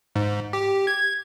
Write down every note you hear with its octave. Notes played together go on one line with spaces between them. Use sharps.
G#2
G4
G#6